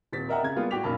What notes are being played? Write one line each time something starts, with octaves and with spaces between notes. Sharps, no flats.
D#1 C4 A6 B6
A#4 D#5 E5 F#5 G5 A#5
C#3 G#6
G3 G#3 A#3 B3 F4
A2 F#4 G5 D6 B6 F7
B1 F#2 A#2 A5 B5